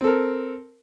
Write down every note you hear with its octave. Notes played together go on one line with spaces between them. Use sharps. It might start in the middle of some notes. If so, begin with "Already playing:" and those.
C4 A4 A#4